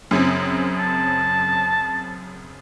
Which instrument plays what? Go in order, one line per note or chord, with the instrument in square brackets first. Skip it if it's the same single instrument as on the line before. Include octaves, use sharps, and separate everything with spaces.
[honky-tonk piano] F#2 C#3 C4
[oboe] A5